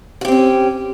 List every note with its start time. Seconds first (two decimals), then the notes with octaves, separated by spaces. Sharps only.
0.21 F#4
0.25 G4
0.28 C4
0.32 C#4